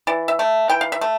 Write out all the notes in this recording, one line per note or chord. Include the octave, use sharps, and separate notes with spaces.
E3 D5
E5
A3
E3 G5
F5
E5
A3